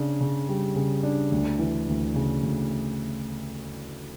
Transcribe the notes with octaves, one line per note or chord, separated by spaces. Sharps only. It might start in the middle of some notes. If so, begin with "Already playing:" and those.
Already playing: C#3 D4
C#3
G3
C#3
D4
D2
E3
D2
C#3
D2